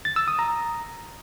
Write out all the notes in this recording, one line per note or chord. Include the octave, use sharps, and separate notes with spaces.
A6
E6
D#6
A#5